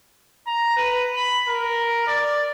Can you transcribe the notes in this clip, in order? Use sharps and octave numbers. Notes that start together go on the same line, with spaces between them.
A#5
B4
B5
A#4
D5